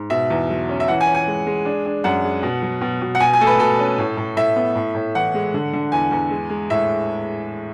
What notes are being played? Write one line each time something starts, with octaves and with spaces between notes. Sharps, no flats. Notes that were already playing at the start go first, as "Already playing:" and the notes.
Already playing: G#2
B2 E5
E2
F#3
C#4
E5
E3 F#5
G#5
C#4
G#5
G#3
G#3
D4
D4
F#2 F#5
G#3
B2
F#3
B2
B2
F#5
B2 G#5
G#5
A3 A4
B4
B2 A4
C#4
A2
A2
A2 E5
B3
A2
A2
E3 F#5
G#3
D3
D3
E2 G#5
E2
G#3
G#3
A2 E5